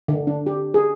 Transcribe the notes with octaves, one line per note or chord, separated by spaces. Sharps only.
D3
D4
G4
G#4